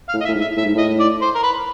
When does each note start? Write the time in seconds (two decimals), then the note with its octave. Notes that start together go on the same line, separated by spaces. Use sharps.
0.09 F5
0.14 A2
0.21 D#5
0.25 E5
0.28 A2
0.35 G#2
0.41 E5
0.57 A2 E5
0.66 G#2
0.75 A2 D#5
1.00 D5
1.22 C5
1.35 A#4
1.43 B4